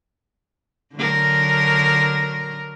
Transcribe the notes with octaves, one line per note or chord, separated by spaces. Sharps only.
D3 F#3 A#4